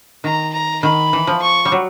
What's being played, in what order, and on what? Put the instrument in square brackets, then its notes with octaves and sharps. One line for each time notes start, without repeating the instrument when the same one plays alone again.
[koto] D#3 [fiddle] A#5
[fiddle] A#5
[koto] D#3 [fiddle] B5
[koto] E3
F3
[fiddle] C#6
[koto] G3
F#3